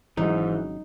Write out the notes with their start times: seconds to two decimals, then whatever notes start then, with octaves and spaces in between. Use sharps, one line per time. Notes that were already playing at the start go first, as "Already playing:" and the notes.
0.17 G#1 G#2 C#3 E3 F#3 D#4